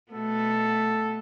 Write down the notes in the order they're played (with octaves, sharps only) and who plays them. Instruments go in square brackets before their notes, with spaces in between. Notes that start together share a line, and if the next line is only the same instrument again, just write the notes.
[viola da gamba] B2 A3 B3 [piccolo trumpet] A4